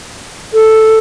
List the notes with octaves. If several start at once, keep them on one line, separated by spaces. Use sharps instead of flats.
A4